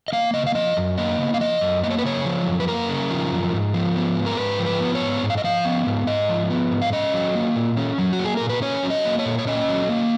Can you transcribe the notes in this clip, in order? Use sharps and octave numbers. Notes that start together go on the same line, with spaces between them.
D#5
A#3 F5
C#3 D#5
F5
F3 D#5
F#2
A#3 D#5
C#3
F5
F3 D#5
F#2
A#3 D#5
C#5
B4
C#3 C#5
F3
F#2
B4
A#3 A#4
C#3
F3
F#2
G#2
F3
B3
G#2
A#4
G#2 B4
F3
B4
B3
C#5
G#2
G#2
F5
D#5
F3 F5
B3
G#2
G#2 D#5
F3
B3
G#2
F5
C#4 D#5
F#3
A#3
A#2
C#4
F#3
F#4
A#3
G#4
A#2 A#4
B4
C#4 C#5
F#3
D#5
A#3
C#5
A#2
C#5
C#4 D#5
F#3
A#3